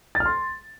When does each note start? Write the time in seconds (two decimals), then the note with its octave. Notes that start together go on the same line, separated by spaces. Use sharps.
0.15 A6
0.20 F6
0.26 C6